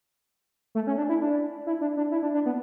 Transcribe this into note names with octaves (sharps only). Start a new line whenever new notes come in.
A3
C#4
D4
E4
D4
E4
D4
D4
E4
D4
D4
B3